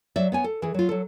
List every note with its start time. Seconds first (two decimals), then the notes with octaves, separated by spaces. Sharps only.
0.16 F#3 D5 E5
0.32 B3 C#5 G#5
0.44 A4
0.62 E3 G#4
0.74 F#3 F4
0.89 F#3 A4